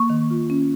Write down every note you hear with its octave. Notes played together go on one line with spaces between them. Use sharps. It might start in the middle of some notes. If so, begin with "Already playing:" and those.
Already playing: A#3 C#6
D#3
F4
C#4